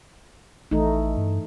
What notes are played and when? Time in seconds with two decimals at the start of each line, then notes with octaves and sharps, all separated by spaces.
0.71 A1 E3 A3 D#4
1.17 G2